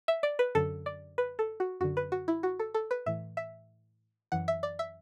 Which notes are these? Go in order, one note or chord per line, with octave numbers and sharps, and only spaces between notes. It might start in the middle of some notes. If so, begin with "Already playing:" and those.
E5
D5
B4
F#2 D3 A4
D5
B4
A4
F#4
F#2 D3 F#4
B4
F#4
E4
F#4
A4
A4
B4
A2 E3 E5
E5
F#2 E3 F#5
E5
D5
E5